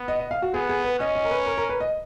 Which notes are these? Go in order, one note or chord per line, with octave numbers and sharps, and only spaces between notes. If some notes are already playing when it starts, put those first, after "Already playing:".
Already playing: B3
D#5
D#5
F5
F#4
B3 G#4
G#4
B4
C#4 D#5
D#5
A#4
B4
A#4
A#4
B4
D#5